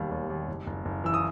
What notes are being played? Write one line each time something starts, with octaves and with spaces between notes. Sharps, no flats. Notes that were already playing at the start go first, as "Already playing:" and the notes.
Already playing: E1 D#2 G3
D#2
D#2
F#1
F#1
F#1
E3 E6
D#6